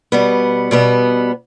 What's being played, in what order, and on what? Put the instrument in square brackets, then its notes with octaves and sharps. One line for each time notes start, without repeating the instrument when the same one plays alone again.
[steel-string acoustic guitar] B2 G3 B3
B2 G3 B3